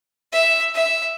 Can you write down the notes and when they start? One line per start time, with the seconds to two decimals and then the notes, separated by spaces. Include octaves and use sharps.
0.33 E5
0.75 E5